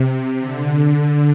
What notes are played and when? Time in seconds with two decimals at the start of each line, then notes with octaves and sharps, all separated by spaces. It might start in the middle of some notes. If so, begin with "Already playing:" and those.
Already playing: C3
0.41 D3